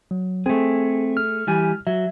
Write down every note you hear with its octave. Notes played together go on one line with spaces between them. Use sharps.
F#3
A3 C4 G#4
F6
E3 G3 G#5
F#3 E5